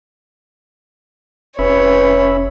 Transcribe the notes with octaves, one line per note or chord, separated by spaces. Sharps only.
F1 C3 E3 C#4 B4 C#5 E5 B5